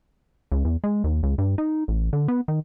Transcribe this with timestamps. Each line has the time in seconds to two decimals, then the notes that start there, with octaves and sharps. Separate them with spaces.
0.52 C#2
0.65 E2
0.84 G#3
1.04 D#2
1.23 C#2
1.38 G2
1.58 D#4
1.88 A1
2.13 D3
2.28 B3
2.48 D#3